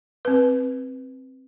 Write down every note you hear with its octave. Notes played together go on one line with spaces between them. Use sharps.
C4 B4